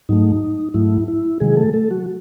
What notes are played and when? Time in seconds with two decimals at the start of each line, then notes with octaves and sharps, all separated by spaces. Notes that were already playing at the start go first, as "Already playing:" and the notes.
0.09 G#2 F#3 A3 D#4
0.74 G#2 F#3 A3 E4
1.08 E4
1.40 C3 D#3 F#3 G#3 G#4
1.57 A3 A4
1.73 A3 A4
1.91 F#3 F#4